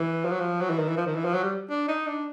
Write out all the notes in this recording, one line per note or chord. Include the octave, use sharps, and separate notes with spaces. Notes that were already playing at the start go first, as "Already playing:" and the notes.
Already playing: E3
F3
F#3
F3
F#3
E3
D#3
E3
F3
D#3
E3
F3
F#3
G3
D4
D#4
D4